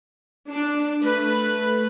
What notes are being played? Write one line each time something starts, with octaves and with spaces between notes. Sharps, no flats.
D4
A3 B4